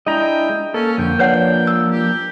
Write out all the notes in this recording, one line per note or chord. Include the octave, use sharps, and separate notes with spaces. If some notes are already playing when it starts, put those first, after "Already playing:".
G#3 D4 E4 D#5 G5 A#5
A#3 C#4 A4
F2 D3 G5
F3 D4 B4 C#5 F#5
E6
G4